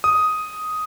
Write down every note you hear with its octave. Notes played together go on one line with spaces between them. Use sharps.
D#6